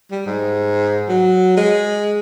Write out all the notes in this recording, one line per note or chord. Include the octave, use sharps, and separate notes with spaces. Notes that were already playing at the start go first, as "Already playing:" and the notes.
G3
G#2
F#3
G#3